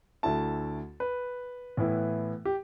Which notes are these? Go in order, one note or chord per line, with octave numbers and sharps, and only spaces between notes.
D2 D3 A3 E4 A5
B4
A2 E3 B3 E4
G4